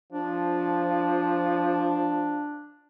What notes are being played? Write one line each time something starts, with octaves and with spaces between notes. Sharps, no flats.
F3 D4